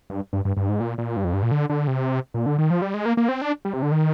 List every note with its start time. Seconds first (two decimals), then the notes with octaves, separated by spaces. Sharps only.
0.10 G2
0.33 G2
0.45 G2
0.57 G2
0.69 G#2
0.80 A#2
0.98 A#2
1.17 G2
1.25 F2
1.33 G2
1.43 A#2
1.51 D3
1.70 D3
1.88 C3
2.34 A#2
2.46 D3
2.58 D#3
2.70 F3
2.82 G3
2.94 G#3
3.06 A#3
3.17 A#3
3.29 C4
3.41 D4
3.65 G3
3.74 C3
3.82 D3
3.92 D#3